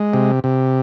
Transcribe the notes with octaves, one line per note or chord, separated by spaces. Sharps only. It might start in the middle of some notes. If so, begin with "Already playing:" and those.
Already playing: G#3
C3
C3